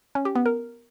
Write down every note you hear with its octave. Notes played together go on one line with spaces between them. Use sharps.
C#4
G4
B3
A#4